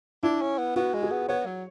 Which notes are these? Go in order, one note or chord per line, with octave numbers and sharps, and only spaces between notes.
D4 E4
C#4
B3
B3 F#4
G#3
G#4
B3
B3 C#5
F#3